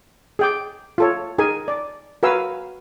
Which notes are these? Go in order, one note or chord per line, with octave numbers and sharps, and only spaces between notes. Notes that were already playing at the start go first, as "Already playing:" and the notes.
G#4 G5 D6
F4 A4 C#5
D#4 G#4 A#4 G#5
D5
F#4 A#4 B4 F5 G#5 E6